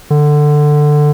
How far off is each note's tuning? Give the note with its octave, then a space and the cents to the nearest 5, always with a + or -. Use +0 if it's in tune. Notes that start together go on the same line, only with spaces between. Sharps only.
D3 +15